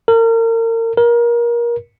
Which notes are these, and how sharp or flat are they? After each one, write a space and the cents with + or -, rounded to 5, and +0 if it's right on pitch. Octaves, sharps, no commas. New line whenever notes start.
A#4 -35
A#4 +25